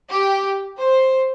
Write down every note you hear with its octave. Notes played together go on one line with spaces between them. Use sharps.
G4
C5